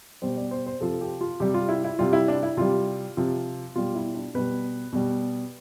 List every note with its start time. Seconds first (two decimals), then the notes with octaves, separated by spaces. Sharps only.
0.22 B2 G3 C5
0.37 D5
0.51 C5
0.66 C5
0.81 C3 F3 A4
1.01 G4
1.21 F4
1.40 C3 G3 G4
1.54 F4
1.69 E4
1.84 E4
1.99 C3 G3 F4
2.13 E4
2.28 D4
2.43 E4
2.57 C3 G3 F4
3.17 C3 F3
3.75 B2 G3 F4
3.95 E4
4.15 D4
4.35 B2 G3 B4
4.93 B2 G3